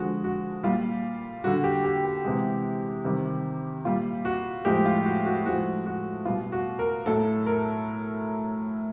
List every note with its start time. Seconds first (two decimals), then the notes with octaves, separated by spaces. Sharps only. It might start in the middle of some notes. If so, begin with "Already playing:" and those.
Already playing: D3 F3 G#3 F#4
0.24 F#4
0.63 A#2 G3 F4
1.44 D3 G3 F#4
1.64 G4
1.84 G4
2.04 G4
2.25 C3 E3 G#3
3.05 C3 D#3 G3
3.85 A#2 G3 F4
4.25 F#4
4.65 A2 F3 G#3 G4
4.86 F4
5.05 F#4
5.26 F#4
5.45 A2 F3 G#3 F#4
5.86 F#4
6.25 B2 G3 F4
6.52 F#4
6.79 A#4
7.06 A2 F#3 A4
7.46 A#4